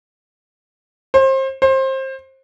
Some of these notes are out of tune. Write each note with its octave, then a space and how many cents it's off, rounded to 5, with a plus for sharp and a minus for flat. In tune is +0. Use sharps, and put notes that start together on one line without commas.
C5 +30
C5 +25